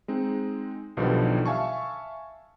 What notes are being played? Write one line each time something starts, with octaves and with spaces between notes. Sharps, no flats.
G#3 C4 D#4
B1 B2 D3 D#3 F3 G3
E5 F5 G#5 A5 C#6